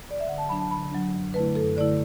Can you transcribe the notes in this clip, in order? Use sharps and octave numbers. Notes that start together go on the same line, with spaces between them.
D5
E5
D3 F#5
A5
F#3 D4 B5
A5
D3 B5
F#3 D4
F#2
D3 A3 E4 B4
F#2 A4
D3 A3 E4 D5